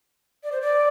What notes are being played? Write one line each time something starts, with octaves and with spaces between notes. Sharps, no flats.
D5
C5
D5